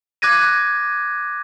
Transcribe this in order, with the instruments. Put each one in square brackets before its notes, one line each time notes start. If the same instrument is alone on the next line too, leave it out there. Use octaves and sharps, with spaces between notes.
[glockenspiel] D6 F#6 G#6 A#6 D#7